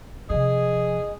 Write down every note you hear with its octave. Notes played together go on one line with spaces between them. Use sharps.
C3 F3 G#4 D#5